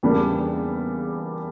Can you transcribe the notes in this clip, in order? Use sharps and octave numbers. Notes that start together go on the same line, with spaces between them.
E2 C#3 G3 A#3 D4